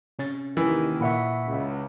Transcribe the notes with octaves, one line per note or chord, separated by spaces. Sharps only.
C3 C#4 A6
D#2 D#3 E3
A#2 E5 F#5 B5 C#6
C#2